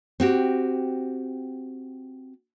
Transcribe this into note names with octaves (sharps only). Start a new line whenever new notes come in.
C4 F#4 G4